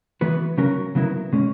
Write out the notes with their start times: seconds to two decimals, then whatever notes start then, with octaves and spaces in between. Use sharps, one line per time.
0.21 E3 B3 F#4 B4
0.58 C#3 F#3 C#4 F#4 A#4
0.95 C#3 F#3 B3 E4 A#4
1.33 B2 G#3 C#4